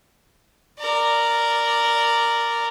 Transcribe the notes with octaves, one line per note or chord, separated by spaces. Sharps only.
A#4 D5